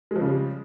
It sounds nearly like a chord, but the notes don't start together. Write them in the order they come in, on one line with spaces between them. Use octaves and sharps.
G#3 F3 C#3 G3